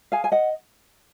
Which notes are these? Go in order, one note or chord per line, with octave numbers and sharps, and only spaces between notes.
G#4 F5 G#5
G#5
D#5 F#5